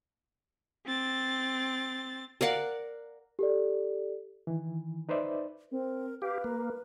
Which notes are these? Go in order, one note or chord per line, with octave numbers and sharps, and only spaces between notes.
C4 A6
A#4 D5 F5 F#5
G4 A4 D5
D#3 E3
D#4 B4 C5 D5 E5
C4 A#4
G4 B4 F5
A#3 A#4